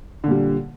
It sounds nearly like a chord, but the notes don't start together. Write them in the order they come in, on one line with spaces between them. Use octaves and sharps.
D3 A#2 G3